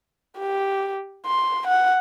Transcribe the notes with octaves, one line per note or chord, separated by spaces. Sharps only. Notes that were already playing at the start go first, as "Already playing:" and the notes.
G4
C6
F#5